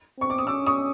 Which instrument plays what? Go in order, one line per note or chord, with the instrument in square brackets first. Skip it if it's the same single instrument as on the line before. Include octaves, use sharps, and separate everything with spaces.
[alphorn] C4 [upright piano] C#6
[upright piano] D6
D#6
[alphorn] C#4 [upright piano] D6 E6
[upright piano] C#6 D#6